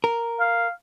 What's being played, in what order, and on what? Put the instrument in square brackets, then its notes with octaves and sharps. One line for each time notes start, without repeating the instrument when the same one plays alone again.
[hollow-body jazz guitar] A#4
[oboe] F5